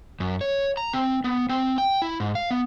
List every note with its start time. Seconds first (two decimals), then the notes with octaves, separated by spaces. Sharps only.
0.20 F#2
0.41 C#5
0.77 A#5
0.93 C4
1.24 B3
1.49 C4
1.78 G5
2.02 E4
2.20 G#2
2.35 F5
2.51 B3